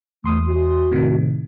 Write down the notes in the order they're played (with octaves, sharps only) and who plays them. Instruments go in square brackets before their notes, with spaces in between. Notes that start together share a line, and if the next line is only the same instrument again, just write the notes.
[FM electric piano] E2 C6 D#6 [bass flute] A3
[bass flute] F#4
[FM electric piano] A2 C3 D#3